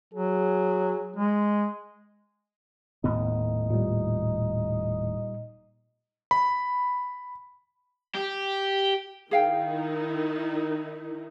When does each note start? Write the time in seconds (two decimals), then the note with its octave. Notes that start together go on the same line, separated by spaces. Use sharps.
0.14 F#3 G#4
1.17 G#3
3.04 D#1 A2 B3 D#4
3.70 A#2 G3
6.31 B5
8.15 G4
9.31 D#3 D#4 E4 G#4 F5 G5